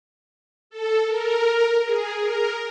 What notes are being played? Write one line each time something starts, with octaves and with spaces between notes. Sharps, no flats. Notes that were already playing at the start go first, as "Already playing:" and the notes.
A4
A#4
G#4
A#4